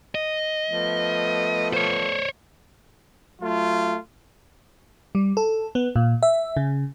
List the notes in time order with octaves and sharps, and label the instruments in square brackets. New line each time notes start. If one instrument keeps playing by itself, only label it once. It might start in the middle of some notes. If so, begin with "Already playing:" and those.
[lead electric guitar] D#5
[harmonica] F3 A3 B3
[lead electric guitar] C5 C#5
[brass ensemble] F#3 A3 F4
[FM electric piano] G3
A4
B3
A#2
E5
C#3